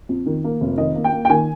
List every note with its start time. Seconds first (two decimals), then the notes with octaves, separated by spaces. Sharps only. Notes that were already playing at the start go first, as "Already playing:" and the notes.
0.09 F2
0.26 D#3
0.44 A#3
0.61 F1
0.77 D#3 D#5
0.95 A#3
1.04 G5
1.13 A#3
1.25 G5
1.30 D#3 G#5